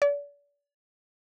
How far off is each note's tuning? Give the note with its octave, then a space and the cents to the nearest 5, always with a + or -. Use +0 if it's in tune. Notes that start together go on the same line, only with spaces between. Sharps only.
D5 -40